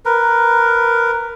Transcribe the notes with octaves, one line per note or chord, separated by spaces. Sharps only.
A#4 B4